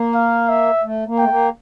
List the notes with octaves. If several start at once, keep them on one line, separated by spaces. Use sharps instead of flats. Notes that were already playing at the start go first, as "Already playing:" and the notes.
Already playing: A#3
F5
E5
A3
A#3
A3 G5
A#3